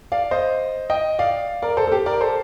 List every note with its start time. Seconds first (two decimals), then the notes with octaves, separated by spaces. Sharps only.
0.12 D5 F5
0.31 C5 D#5
0.90 D#5 G5
1.19 D5 F5
1.62 A#4 D5
1.77 A4 C5
1.87 A4
1.92 G4
2.06 A#4 D5
2.21 A4 C5